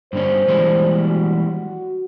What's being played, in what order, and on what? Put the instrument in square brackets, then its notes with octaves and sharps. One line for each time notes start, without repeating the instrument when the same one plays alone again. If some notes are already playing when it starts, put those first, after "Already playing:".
[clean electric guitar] G2 D3 C#4 [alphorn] C5
[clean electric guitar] E3 G3 G#3
[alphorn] F#4